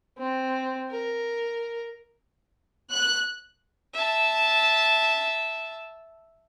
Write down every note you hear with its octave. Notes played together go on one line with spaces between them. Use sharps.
C4
A#4
F#6
E5 A5